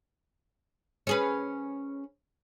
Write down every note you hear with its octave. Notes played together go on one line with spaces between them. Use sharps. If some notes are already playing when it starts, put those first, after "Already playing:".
C#4 G#4 B4